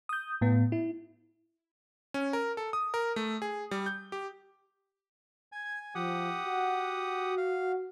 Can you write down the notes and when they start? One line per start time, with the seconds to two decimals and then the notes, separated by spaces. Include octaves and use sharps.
0.09 D#6 G6
0.41 A2 B3
0.72 E4
2.14 C#4
2.33 A#4
2.57 A4
2.73 D#6
2.94 A#4
3.16 A3
3.42 G#4
3.71 G3
3.86 G6
4.12 G4
5.52 G#5 G#6
5.95 F3 G4 F#5 D#6
6.44 F#4
7.38 F5